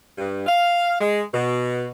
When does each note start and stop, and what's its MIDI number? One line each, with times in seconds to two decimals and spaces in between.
0.17 0.46 43
0.46 0.96 77
1.00 1.22 56
1.33 1.91 47